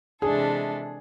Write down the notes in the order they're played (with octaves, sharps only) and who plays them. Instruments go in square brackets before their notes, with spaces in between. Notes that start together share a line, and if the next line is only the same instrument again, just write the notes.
[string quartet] C3 E3 G#3 D4 A4 [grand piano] G#4